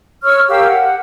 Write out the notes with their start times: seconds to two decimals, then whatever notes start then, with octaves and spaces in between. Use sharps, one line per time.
0.24 C#5 C#6 E6 F6
0.48 G4 A#4 F5 E6
0.66 F#5